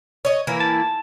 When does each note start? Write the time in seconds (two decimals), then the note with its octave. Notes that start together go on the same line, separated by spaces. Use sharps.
0.25 C#5 D#5
0.47 E3 A#3 E4
0.60 A5